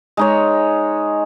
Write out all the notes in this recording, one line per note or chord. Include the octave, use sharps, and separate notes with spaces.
G#3 D#4 C#5